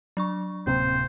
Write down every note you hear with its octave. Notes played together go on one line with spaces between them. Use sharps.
F#3 D4 C#6
D1 C3 A#3 C4 C5